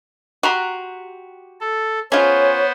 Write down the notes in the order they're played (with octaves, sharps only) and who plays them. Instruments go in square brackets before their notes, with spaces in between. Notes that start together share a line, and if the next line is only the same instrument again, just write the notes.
[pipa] F#4 [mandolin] G4 A#5 C6
[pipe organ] A4
[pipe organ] B3 C5 [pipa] C#4 F4 [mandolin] G#4 [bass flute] C#5